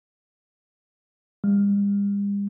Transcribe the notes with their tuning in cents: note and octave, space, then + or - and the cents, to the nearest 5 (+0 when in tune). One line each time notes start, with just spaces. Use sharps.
G3 +45